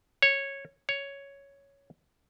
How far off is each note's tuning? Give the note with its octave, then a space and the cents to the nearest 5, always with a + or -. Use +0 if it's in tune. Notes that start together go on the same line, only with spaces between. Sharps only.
C#5 -10
C#5 +5